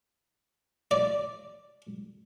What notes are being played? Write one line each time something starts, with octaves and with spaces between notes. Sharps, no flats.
D5